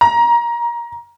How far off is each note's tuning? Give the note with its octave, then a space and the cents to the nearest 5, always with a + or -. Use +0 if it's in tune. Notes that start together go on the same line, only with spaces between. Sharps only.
A#5 +20